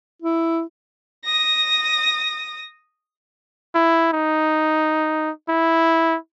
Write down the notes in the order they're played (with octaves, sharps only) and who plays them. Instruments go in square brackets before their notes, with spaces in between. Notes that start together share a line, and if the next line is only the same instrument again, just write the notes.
[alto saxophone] E4
[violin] D#6 A#6
[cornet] E4
D#4
E4